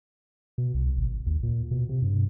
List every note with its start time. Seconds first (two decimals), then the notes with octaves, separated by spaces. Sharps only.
0.58 B2
0.74 C2
0.98 G#1
1.26 D#2
1.43 A#2
1.71 B2
1.89 C3
2.02 G2